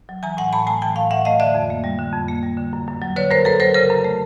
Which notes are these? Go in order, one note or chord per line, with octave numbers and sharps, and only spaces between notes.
F#3
E3 G#5 A#5
A2 F#5 G#5
A2 A5 B5
A3 G#5 A#5
E3 G5 A5
A2 F5 G5
A2 E5 F#5
A3 D#5 F5
D3 D5 E5
F2
A#3
G3
D3
F2
A#3
G3
D3
F#2
F#2
F#3
D3 B4 C#5
F#2 A#4 C5
F#2 A4 B4
F#3 A#4 C5
C#3 A#4 C5
F#2
A3